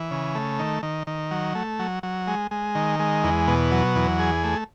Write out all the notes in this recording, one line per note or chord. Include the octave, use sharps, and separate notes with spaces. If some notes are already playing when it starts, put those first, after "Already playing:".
Already playing: E3
C#3
A3
D#3
D#3
D#3
F#3
A3
F#3
F#3
G#3
G#3
D#3
G#3
E2
B2
F#3
E2
G#4
A3